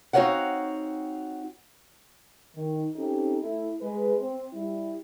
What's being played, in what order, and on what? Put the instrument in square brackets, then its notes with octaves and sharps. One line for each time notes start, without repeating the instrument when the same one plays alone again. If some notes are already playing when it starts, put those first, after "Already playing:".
[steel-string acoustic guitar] C4 D#4 F#4 C#5 F5 F#5
[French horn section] D#3
C4 C#4 D#4 G4 A4
A3 E4
G#3 B4
C4
G3 E4